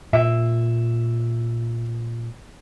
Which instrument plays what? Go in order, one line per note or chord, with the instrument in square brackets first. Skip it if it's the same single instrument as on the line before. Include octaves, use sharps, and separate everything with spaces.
[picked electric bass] A#2 [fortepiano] E5